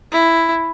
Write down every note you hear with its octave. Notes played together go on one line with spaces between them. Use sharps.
E4